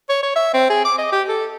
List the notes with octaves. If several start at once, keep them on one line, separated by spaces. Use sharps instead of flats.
C#5
C#5
E5
C4
G#4
D6
D#5
G4
A4